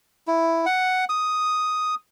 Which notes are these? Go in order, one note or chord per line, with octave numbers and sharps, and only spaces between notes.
E4
F#5
D#6